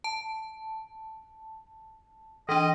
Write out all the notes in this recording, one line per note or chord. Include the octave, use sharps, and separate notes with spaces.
A5
E3 D4 D#5